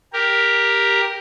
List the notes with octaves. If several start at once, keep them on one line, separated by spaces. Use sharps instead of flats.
G4 A#4